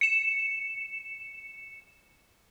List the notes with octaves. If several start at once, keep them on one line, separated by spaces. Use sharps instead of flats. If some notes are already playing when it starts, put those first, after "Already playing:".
C#7 E7